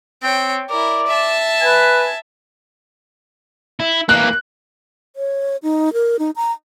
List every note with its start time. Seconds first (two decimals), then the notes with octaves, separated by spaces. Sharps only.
0.23 C4 C#5 G5
0.69 E4 A#4 D5
1.07 E5 A5
1.61 B4 G#5
3.80 E4
4.09 E3 A#3 F#6
5.16 C#5
5.63 D#4
5.93 A#4
6.19 D#4
6.36 A#5